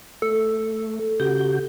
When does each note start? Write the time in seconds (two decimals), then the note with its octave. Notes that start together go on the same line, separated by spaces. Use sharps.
0.22 A3 A4
1.20 C#3 F#4 G4 G6